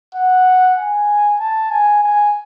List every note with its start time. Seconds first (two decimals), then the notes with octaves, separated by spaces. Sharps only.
0.15 F#5
0.78 G#5
1.40 A5
1.71 G#5
2.04 G#5